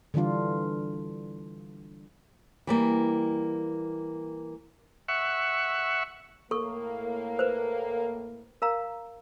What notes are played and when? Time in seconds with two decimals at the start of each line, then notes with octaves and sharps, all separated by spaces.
0.14 D3 E3 G3 D4 F4
2.67 E3 G3 A#3
5.08 E5 F#5 C#6
6.51 A2 A#3 A4 C#6
7.39 B4 C5
8.62 A#4 F5 A#5